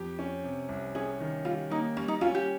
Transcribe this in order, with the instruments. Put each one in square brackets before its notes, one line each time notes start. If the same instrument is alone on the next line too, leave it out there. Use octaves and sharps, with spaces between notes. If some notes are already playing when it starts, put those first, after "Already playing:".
Already playing: [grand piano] F2 G4
C#4
C3
C2
[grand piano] C#4 [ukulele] G#4
[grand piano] D#3
[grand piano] G3 [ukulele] F4
[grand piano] A#3 [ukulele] D#4
[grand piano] G3 [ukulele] C#4
[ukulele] D#4
[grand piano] C#4 [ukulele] F4
[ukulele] G4